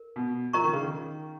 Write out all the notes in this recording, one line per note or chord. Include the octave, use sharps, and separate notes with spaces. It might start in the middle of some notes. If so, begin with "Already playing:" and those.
Already playing: A#4
B2
F3 A#4 D#5 A#5 C#6
D#3
C#3
D#3